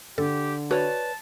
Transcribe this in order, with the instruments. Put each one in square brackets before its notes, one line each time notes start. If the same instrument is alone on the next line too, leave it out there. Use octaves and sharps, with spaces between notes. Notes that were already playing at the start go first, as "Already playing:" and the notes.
[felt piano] D3 [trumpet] G4 [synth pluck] A4
[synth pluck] F#4 [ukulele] B4 C#5 D5 [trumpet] A5